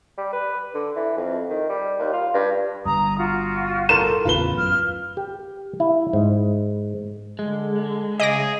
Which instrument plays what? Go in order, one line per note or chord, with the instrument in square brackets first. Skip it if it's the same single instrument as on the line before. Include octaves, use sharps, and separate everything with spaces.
[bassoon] G3
B4
D3
E3
F2
D#3
G3
D#2
F4
G2
[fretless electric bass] G1 G2 [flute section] A#5 D#6
[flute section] F4 F#4
[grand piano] A4 A#4 C6 [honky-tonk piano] E7
[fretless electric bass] A1 E2 C#3 [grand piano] F4 B4 G7
[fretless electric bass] F#2 [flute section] F6
[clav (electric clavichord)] G4
E4
G#2
[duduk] D3 [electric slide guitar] G#3
[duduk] C#3 [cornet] G#4 [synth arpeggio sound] D#5 D6 A#6